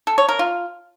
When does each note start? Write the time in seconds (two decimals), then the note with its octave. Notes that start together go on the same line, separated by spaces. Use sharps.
0.07 A4
0.18 C#5
0.29 A#4
0.39 F4